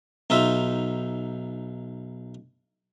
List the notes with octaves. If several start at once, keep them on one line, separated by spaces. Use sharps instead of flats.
B1 D#4 F4 E5